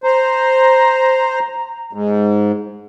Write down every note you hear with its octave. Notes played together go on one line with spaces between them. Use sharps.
C5 A#5
G#2